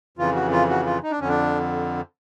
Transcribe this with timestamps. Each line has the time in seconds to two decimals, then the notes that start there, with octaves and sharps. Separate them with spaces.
0.17 F2 C#3 E3 F4
0.35 F#4
0.52 F4
0.70 F#4
0.86 F4
1.03 D#4
1.11 D4
1.20 F2 D3 C#4
1.29 D4